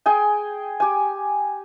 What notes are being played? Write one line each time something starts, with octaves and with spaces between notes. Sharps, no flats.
G#4 G5 G#5
G4 G#5